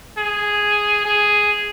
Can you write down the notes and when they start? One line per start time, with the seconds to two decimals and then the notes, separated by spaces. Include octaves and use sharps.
0.18 G#4
1.05 G#4